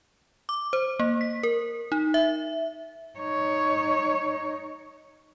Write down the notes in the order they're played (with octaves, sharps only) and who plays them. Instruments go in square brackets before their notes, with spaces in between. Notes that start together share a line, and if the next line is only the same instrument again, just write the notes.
[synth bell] D6
C5
A#3
B6
A#4
D#4
E5
[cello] D#4 C#5